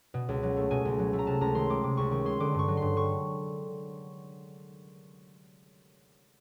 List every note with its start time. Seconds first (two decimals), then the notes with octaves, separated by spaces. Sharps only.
0.14 B2
0.29 C#2
0.43 F#3
0.57 A3
0.71 B2 G#5
0.85 C#2
0.99 F#3
1.13 A3
1.19 A#5
1.27 C3 A5
1.41 C#2 A#5
1.55 D#3 C6
1.69 G#3 D6
1.83 C3 D6
1.97 C#2 C#6
2.11 D#3 C#6
2.25 G#3 C6
2.40 D3 D6
2.54 G2 C#6
2.68 F#3
2.77 G2 C6
2.96 D3 C#6